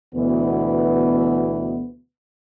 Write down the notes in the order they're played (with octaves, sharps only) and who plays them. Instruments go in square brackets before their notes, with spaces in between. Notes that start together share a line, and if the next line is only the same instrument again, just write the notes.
[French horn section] D2 B2 E3 B3